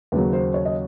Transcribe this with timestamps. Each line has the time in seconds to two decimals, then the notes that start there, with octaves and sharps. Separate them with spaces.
0.12 D#2 C#3 F#3 B4
0.33 C5
0.54 C#5
0.65 D#5